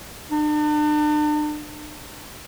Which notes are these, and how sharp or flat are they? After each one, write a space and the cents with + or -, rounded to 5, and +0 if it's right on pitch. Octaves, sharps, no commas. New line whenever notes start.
D4 +40